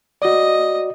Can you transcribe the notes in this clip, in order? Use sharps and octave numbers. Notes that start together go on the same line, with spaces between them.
F#4 D5 D#5